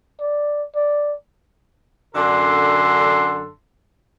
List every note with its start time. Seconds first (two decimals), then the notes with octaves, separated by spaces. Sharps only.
0.21 D5
0.75 D5
2.15 F#2 D3 D4 A4 C6